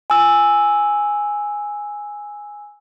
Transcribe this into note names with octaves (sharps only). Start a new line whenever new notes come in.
G#5 E6